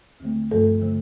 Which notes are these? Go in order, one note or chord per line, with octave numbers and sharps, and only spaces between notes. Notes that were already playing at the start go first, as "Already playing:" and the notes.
D2 D3 A3
G2 F3 A3 A4
D3 F3 A3